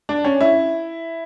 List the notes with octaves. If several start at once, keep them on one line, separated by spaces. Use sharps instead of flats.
D4
C#4
E4